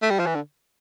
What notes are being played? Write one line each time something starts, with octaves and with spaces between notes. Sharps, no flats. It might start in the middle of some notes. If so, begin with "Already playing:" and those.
A3
G3
F3
E3
D3